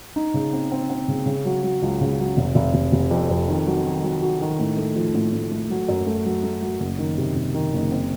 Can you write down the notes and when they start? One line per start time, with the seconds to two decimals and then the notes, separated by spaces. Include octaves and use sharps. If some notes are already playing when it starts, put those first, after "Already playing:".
0.16 D#4
0.34 C#3
0.53 C4
0.72 C4
0.90 C4
1.08 C#3
1.26 C#3
1.45 F#3
1.63 F#3
1.82 C#2
2.01 C#3
2.19 F#3
2.37 F1
2.55 F1
2.74 F1
2.92 F1
3.11 F2
3.30 F2
3.49 D#3
3.67 F#3
3.85 D#3
4.04 F#3
4.22 F#4
4.41 D#3
4.59 A2
4.77 A3
4.96 F3
5.15 A2
5.33 A2
5.51 A3
5.70 F#3
5.88 F#2
6.06 A3
6.25 F#3
6.43 A3
6.62 F#3
6.80 F#1
6.99 D#3
7.18 C3
7.35 C3
7.54 D#3
7.73 F#1
7.92 C4